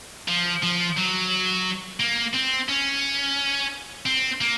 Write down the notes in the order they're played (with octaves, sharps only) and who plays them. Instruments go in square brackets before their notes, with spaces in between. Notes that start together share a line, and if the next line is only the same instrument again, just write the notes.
[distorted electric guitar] F3
F3
F#3
A#3
C4
C#4
C4
A#3